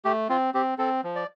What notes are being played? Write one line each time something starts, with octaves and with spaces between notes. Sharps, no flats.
A3 G4
C4 F4
C4 G4
C4 A4
F3
D5